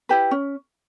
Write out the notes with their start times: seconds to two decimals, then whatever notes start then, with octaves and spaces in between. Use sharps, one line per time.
0.09 E4 G4 B4
0.31 C#4